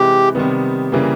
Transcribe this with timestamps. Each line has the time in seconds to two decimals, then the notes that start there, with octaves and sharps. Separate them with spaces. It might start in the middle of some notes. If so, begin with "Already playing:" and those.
Already playing: C3 E3 G#3 G4
0.35 C3 D#3 G3 B3
0.92 C#3 E3 G3 A#3